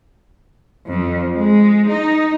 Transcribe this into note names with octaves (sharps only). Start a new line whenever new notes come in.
F2
G#3
D#4